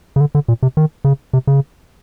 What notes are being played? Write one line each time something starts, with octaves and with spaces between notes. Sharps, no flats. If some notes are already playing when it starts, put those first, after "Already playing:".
C#3
D3
D3
A#2
C3
D#3
C#3
C3
C#3